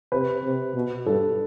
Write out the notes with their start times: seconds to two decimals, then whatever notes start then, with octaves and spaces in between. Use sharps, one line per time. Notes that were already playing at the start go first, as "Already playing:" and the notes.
0.12 C3 B4
0.44 C3
0.74 B2
1.06 G2 A4